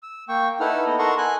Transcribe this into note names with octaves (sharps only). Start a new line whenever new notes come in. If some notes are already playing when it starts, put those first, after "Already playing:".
E6
A#3 G5 C#6
D#4 E4 A4 B4 F#5 F6
B3 D#5
A4 A#4 D#5 F#5 C6 C#6
G#5 F#6